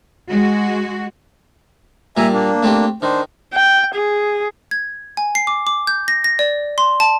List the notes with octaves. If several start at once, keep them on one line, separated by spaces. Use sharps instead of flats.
G#3 F#4
A#2 G3 E5 G#5 A#5
A#3 D4
A3 C4 G4
D#3 D4 C5
G5
G#4
G#6
G#5
C7
D6
D6
G6
A#6
A#6
D5
C6
A5